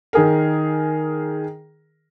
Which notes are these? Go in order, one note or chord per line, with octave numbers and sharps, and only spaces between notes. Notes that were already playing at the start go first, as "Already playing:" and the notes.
D#3 G#4 A#4